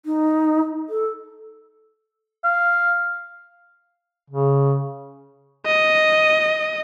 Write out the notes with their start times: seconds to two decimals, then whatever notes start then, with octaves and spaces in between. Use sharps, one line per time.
0.06 D#4
0.89 A4
2.44 F5
4.30 C#3
5.66 D#5